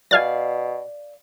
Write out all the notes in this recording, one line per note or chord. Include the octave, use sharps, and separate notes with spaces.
B2 D5 F5 G#5 F6 A6